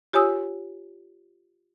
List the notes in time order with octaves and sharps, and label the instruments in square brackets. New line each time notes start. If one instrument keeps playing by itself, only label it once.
[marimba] F4 G4 C#5 G#5 D#6 E6